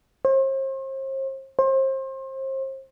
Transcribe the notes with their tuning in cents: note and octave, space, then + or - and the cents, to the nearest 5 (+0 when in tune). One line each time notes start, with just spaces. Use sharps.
C5 +40
C5 +30